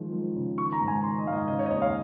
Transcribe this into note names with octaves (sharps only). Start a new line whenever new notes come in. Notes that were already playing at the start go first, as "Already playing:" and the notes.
Already playing: D#3 F3 G#3
F3
C#3
D#3 C#6
A#5
G#2
G#5
D#3 C6
D#5
G#2 F5
D#5
C#3 D#5
C#5
D#5
D#2 C#5
F5